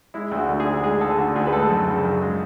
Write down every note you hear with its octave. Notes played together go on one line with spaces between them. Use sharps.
G#3 E4
D2
F#4
D3
G#4
D2
G#3 G#4
D2 A4
D3 F#4
D2 G#4
B4
G#3 A4
F#2
C#3
F#2
G#3